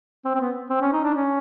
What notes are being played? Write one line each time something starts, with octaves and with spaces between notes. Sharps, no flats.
C4
C4
B3
C4
C#4
D#4
D4
C#4